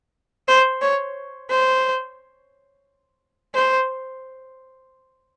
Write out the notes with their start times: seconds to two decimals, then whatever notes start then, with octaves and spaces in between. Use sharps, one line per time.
0.48 C5
0.82 C#5
1.50 C5
3.55 C5